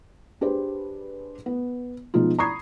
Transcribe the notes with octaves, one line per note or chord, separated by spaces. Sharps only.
D4 G4 G#4 B4 C5
B3
B2 F3 G#3 D#4 F4
A#5 B5 C#6 D#6 G#6 C7